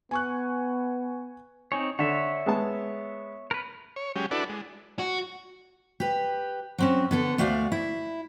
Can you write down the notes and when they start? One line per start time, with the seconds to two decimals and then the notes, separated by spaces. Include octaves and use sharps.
0.11 B3 G#5 C#6 F#6
1.72 C4 D#4 C#5 G#5
1.99 D3 C#5 E5
2.46 G#3 B3 A5
3.51 A#4 B4
3.96 C#5
4.16 F#3 G#3 C#4 G4
4.31 D4 E4 F#4 A4 B4 D5
4.49 G#3
4.99 F#4
6.00 G4 B4
6.78 F#3 C4 C#4
7.11 D3 B3 A4
7.38 D2 A3 F#4 D5 F5
7.72 E4